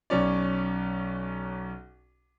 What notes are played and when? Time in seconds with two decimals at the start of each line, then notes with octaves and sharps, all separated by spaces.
0.10 B1 C#4 D5